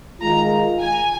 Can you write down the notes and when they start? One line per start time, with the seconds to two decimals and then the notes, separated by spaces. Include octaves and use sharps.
0.21 D#3 G#3 F4 A#5
0.81 G#5